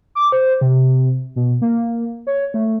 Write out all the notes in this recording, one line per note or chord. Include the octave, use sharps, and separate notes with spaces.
D6
C5
C3
B2
A#3
C#5
A3